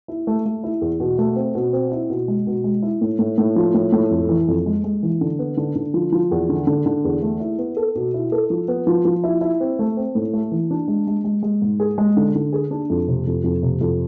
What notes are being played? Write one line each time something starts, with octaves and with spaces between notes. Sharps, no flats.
E4
A3
A3
E4
E2
B2
A3
C4
B2
C4
E4
B2
G#3
B2
G#3
E4
A2
A2
A2
F3
A2
A2
F2
E3
F2
G#3
G#3
E3
D3
B3
D3
D3
F3
F3
E2
D3
D3
D3
E2
A3
E4
B3
A4
B2
E4
A4
F3
B3
F3
F3
E4
E4
C4
A3
C4
A2
A3
E3
D4
G#3
G#3
G#3
G#3
G#2
G#4
G#3
D3
D3
G#4
D4
F2
C3
F2
F2
C3
F2